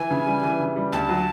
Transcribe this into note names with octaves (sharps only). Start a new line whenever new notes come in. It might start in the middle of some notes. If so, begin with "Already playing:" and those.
Already playing: E3 G#5
C#3
G3
E3
C#3
G3
D2 A5
F#3